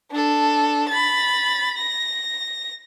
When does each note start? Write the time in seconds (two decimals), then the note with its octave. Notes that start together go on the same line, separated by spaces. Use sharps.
0.11 D4 A4
0.89 B5 A6
1.77 A#6